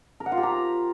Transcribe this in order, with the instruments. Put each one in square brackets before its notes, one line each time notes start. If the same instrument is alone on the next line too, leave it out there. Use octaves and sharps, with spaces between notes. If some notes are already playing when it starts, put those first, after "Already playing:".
[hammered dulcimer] A#4
F#5
F4
G4
A#5